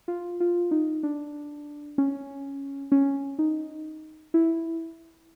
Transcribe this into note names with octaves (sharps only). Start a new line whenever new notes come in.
F4
F4
D#4
D4
C#4
C#4
D#4
E4